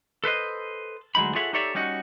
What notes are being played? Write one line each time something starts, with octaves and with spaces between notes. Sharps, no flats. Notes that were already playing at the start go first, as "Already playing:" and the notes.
A4 B4 C5 D#5
D2 F#3 G#3 D#4 B5
F4 G#4 A4 C#5 E5 F#5
D#4 G4 A4 C#5 D5 E5
G3 C#4 D#4 F#4